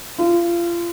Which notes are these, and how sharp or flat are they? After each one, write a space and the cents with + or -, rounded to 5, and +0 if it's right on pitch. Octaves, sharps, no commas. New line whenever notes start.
F4 -30